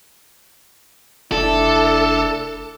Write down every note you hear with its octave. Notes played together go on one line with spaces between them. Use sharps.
F1 D4 E4 A4 E5